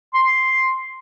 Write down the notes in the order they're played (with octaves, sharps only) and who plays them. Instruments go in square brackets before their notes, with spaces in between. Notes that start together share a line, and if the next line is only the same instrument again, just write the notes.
[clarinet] C6